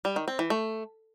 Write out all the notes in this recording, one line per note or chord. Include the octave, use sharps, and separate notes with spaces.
G3
D#3
C4
E3
A3